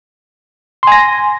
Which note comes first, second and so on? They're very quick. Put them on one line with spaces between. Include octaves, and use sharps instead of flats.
C6 G#5 A#6